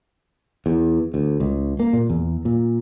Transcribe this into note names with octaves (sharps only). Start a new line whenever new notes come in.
E2
D2
C#2
A#3
A#2
E2
A#2